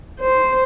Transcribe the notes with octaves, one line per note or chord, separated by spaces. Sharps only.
C5